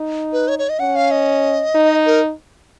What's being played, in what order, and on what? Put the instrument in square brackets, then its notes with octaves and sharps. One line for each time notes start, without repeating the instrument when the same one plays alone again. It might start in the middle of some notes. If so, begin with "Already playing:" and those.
Already playing: [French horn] D#4
[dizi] B4
C#5
C#5
D#5
[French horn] C#4 [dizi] F#5
[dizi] F5
D#5
[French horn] D#4
[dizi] A#4